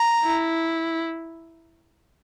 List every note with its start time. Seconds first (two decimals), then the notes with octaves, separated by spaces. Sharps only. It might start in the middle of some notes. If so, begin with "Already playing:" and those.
Already playing: A#5
0.24 E4